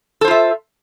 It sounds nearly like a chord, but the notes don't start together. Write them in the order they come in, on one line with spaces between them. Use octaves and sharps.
A4 C5 F4 E5